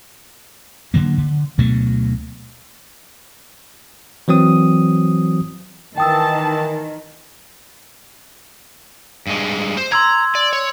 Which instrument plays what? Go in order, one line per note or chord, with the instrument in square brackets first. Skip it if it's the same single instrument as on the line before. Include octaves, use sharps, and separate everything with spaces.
[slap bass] D3 F#3 A#3
D3
D2 B2 F#3 A3
[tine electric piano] E3 F#3 C4 D#6
[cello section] D#3 [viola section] E3 A5 [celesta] G5 D#6 E6
[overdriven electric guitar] G2 G#3
C5
[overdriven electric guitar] A#5 [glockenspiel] C6 E6 G#6
[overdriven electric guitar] D5
C#5